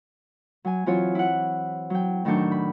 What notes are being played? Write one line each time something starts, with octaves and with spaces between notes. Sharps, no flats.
F#3 G#5
E3 F#3 C4 F4 C#5
E4 F#5
F#3 G5
A2 D#3 F#3 D4 C#6 G6
B5